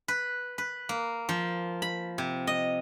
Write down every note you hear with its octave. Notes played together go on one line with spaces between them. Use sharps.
B4
B4
A#3
F3
B5
C3
D#5